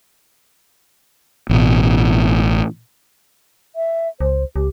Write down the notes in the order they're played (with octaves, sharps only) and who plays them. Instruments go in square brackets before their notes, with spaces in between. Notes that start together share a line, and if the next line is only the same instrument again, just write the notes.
[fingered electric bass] A1 B2
[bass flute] E5
[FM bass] C#2 [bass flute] C5
[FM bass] C#2 [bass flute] G4